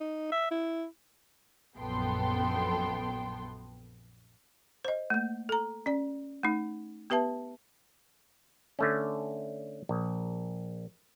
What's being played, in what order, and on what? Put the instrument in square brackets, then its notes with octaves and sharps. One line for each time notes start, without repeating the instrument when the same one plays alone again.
[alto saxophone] D#4
E5
E4
[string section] A#1 F#2 B3 A4 G5 C6
[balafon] C5 D#5
A3 A#3
A4 A#5
C#4 D5
A3 D#4
B3 G4 B4 E5 A5
[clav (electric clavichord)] D3 A3 C#4
A#1